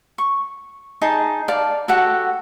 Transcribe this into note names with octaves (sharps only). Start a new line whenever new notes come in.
C#6
D#4 G#4 A5
D5 F5 A5
F#4 G4 A4 F#5